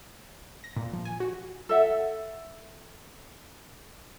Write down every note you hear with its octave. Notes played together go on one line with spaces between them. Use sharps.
A#6
A#2
F3
G#5
F#4
A4 E5 F#5